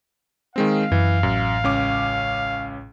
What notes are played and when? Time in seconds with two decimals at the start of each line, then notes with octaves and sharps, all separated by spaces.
0.56 D#3 G#3 C4 F5
0.92 F#2 E3
1.23 A1 F#2
1.64 C#2 C#4 D6